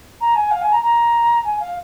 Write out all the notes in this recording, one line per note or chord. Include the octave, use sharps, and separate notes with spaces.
A#5
G#5
F5
G#5
A#5
A#5
G#5
F5